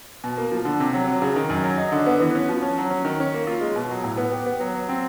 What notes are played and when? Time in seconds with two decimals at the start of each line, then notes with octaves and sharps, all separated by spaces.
0.24 B2
0.38 A#3
0.52 F3
0.65 D3
0.80 C3
0.93 F#3
1.08 F#3
1.22 C#3
1.36 D#3
1.50 F#2
1.64 F#3
1.78 D#4
1.92 D3
2.06 B3
2.20 E3
2.35 C#4
2.49 F3
2.62 C#4
2.78 F#3
2.91 C#4
3.05 D#3
3.20 C#4
3.34 A#3
3.47 F4
3.61 G#3
3.76 B2
3.90 F#3
4.04 A2
4.17 B3
4.32 G4
4.46 B3
4.60 F#3
4.75 F#3
4.89 C4